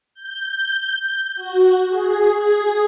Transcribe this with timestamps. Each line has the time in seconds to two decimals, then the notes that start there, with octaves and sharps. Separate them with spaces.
0.14 G6
1.35 F#4
1.89 G#4
2.40 G#4